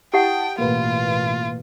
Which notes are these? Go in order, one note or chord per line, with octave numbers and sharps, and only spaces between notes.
E4 G4 F#5 G5 A5 D#6
A1 B2 A#3 F4 B4